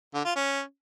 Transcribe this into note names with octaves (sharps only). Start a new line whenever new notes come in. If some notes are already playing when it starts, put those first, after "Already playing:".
D3
F4
C#4